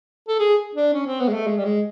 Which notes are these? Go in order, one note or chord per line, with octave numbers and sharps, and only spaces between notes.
A4
G#4
D4
C#4
C4
B3
G#3
A3
G#3
G3
G#3